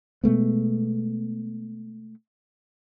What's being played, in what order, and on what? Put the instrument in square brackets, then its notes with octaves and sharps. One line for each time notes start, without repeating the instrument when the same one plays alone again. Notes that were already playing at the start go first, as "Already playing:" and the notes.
[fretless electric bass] B2 G#3 A3 B3